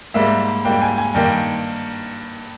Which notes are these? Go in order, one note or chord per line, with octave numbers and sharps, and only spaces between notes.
G#2 G3 A#3 E5
G#2 G3 A#3 G5
G#5
G#5
G2 D#3 A#3 G5